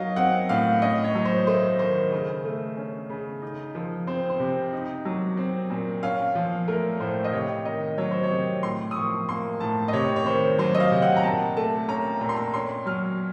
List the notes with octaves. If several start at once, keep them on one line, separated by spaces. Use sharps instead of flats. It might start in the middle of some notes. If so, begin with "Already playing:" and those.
Already playing: F#3 D#4 D#5 F5
C4 F#5
A2 F5
C#4 D#5
C#5
F#3
C5
A3 C5
D#3 C5
C#3
A3
C#4
C#3
D#4
F3
C4 C5
C5
C3
D#4
F#3
C4
A#2
C#4 F5
F3
A3 A#4
A2 C5
D#5
C3 C#5
D#3 D#5
F#3 C#5
C5
C#5
C3
A2 C6
D#6
F3 C#6
A#3 C6
A2 A5
D#5
C3 C#5
C#5
D#3 C5
F#3 C5
D#5
F5
C3
F#5
A#5
A#2 A5
A3 A5
C#4 A#5
A#2 A#5
C6
A#5
C#4 C6
F#3 F6